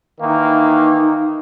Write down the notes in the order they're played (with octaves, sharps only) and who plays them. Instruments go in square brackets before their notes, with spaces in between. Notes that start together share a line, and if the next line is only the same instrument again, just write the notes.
[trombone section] D#3 E3 A#3 [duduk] D#4